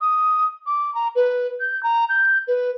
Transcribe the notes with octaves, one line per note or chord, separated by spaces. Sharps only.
D#6
D6
A#5
B4
G6
A#5
G6
B4